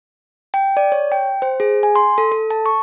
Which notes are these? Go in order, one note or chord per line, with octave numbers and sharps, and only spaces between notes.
G5
D5
C#5
G5
C5
G#4
G#5
C6
A4
A4
A5
C#6